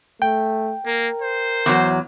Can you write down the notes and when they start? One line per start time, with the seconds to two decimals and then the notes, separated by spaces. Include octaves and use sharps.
0.22 A3 G5
0.86 A#3 A#4
1.22 C5
1.66 E2 F#3